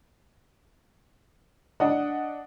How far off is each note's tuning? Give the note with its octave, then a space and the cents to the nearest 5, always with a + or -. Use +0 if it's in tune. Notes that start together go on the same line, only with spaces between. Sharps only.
D4 +0 D#5 +0 F#5 +0